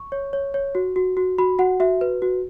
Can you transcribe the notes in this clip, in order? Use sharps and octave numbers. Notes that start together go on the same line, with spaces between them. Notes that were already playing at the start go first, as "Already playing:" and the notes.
Already playing: C#6
C#5
C#5
C#5
F#4
F#4
F#4
F#4 B5
F#4 F#5
F#4 E5
B4
F#4